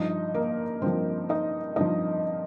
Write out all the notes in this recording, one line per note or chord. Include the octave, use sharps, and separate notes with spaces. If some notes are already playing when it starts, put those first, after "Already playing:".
Already playing: G2 F3 D#4 D#5
A#3 A#4
G2 F3 C4 C5
D#4 D#5
G2 F3 D#4 D#5